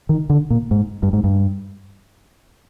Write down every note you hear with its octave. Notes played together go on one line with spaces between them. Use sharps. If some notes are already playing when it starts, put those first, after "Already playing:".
D#3
D3
A#2
G#2
G2
G#2
G2